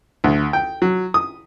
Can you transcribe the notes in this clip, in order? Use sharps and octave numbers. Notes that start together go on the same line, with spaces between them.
D2
G5
F#3
D#6